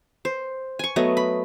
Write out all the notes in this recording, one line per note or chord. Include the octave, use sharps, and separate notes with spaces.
C5
G#5 C#6
F#3 A3 B3 D#5
B5